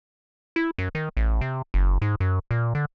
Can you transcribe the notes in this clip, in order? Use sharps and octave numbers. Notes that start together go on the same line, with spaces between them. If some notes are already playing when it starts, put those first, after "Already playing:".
E4
F#2
D#3
A1
C3
F#1
G#2
F#2
A#2
D3